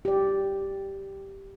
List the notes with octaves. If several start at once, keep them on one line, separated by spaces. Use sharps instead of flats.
G4 D5